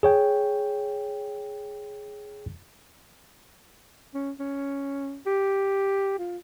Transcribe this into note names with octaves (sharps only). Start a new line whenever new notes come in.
G#4 C#5 G5
C#4
C#4
G4
F4